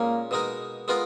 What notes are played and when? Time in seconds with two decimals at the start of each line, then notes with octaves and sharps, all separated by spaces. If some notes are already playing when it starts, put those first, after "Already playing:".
Already playing: A#2 G#3 A#3 C#4
0.31 B2 G#3 D#4 A#4
0.88 G#3 B3 F4 A#4